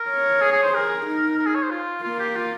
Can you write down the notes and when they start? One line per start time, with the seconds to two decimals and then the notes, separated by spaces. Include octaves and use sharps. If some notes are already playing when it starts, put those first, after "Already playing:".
Already playing: A#4
0.09 C#5
0.42 G#4
0.52 G#4
0.63 C5
0.74 G#4 A#4
1.06 D#4
1.38 A#4
1.47 G#4
1.55 C#5
1.63 C5
1.71 F4
2.03 A#3 F4
2.19 G4
2.36 F4